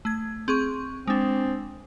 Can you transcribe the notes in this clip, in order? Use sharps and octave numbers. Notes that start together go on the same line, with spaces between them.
A3 G#6
C4 G#4 C#6
G#3 C4 D4